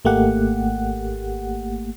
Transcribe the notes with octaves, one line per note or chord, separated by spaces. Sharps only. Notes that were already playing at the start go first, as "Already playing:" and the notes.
G#1 A3 A#3 G4 F#5